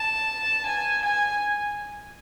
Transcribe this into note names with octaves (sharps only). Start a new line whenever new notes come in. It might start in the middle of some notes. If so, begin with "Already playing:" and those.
Already playing: A5
G#5
G#5